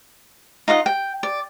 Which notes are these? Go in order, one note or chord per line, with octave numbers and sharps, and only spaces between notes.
D#4 F4 D#5 F#5
G5
D5